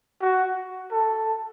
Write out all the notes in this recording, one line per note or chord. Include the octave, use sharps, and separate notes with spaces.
F#4
A4